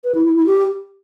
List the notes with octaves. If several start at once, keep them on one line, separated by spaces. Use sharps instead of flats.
B4
E4
E4
E4
G4